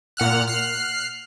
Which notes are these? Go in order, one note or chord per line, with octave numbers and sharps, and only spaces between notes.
A#2 F#5 F6 F#6
F6 F#6 C7